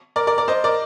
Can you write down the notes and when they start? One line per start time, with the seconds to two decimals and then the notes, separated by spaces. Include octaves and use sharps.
0.16 A#4 D5
0.27 A#4 D5
0.38 A#4 D5
0.48 C5 D#5
0.64 A#4 D5